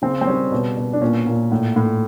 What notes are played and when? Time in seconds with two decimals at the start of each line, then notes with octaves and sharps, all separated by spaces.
0.02 C#3 C4
0.21 C4
0.27 G3 C#4
0.52 B2
0.77 B2
0.93 D4
1.02 A#2 C#4
1.27 A#2
1.52 A2
1.76 A2